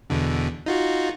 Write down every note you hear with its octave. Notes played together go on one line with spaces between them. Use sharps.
E2 B2 D3
D#4 F4 F#4